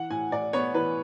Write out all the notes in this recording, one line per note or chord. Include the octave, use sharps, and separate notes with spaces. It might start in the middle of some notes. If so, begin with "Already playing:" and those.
Already playing: E3 F#5
A2 G#5
A2 D5
B3 C#5
E3 B4